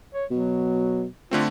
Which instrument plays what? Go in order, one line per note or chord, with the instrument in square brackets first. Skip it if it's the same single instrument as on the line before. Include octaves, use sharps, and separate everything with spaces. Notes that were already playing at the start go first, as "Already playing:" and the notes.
[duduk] C#5
[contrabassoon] B2 [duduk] F#3
[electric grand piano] D3 A3 C4 [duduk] F4